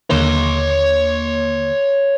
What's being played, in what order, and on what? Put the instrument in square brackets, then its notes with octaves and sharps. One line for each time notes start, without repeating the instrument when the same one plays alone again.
[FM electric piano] D#2 D3 A#3 [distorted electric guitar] C#5 C6